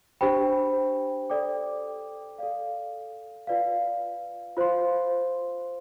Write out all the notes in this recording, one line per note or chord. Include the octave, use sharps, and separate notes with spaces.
D4 G4 C5 G5 B5
A4 D5 G5 D6
A4 D5 F5
F4 B4 D5 F5
F4 C5 F5 C6